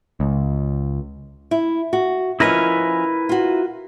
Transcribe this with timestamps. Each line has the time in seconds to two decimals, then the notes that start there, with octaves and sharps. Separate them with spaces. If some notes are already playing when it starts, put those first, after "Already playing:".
0.20 C#2
1.51 E4
1.93 F#4
2.40 F3 C#4 E4 A#4 B4 D#5
3.29 F4 F#4